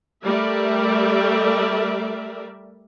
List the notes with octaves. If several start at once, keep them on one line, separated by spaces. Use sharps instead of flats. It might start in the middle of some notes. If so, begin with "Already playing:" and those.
G3 A3 A#4 D5 E5